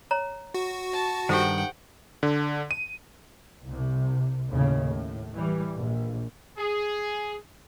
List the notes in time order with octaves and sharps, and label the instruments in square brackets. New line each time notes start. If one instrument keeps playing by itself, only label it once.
[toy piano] C#5 A#5
[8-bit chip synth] F#4
[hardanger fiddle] A5
[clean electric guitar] G2 D#3 [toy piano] G4 A4 C5 [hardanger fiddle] F#5 G5
[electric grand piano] D3
D#7
[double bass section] C2 C3
D#2 A2 C#3
A2
E3 G3
A#1
[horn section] G#4